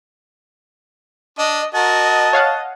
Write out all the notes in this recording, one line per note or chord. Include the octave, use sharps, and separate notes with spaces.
D4 D#5
F#4 A#4 D#5 A5
C#5 F5 F#5